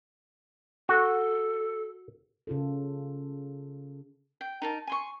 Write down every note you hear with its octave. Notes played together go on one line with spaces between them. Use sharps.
F#4 A4
C#3 F4 A4
G5
D#4 A#4 A5
G#5 C6 C#6